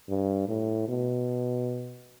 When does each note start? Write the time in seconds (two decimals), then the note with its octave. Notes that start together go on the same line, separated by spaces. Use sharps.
0.09 G2
0.48 A2
0.88 B2